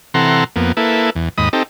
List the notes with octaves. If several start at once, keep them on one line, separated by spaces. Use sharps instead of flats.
C3 E3 A4 F#5 A#5 C6
F2 A#3 B3
A#3 E4 A4 B4
E2
D#2 G#2 D#5 B5 D#6
C4 D#4 G4 A4